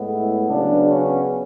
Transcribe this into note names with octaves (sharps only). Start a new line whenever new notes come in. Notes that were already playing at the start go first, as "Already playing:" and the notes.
Already playing: A2 G#3 B3
E4
C#3 F#3 B3 D4
C#4